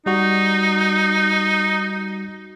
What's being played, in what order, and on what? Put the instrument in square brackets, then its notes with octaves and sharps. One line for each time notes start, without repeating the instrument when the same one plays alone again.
[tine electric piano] G3 F#4 [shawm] D#4